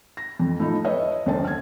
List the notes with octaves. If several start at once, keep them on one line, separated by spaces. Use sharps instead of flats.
A#6
F2
A2 F3 D#4
B4 C#5 D#5 E5
D#1 F#2 D3 C5 A5
F6 G#6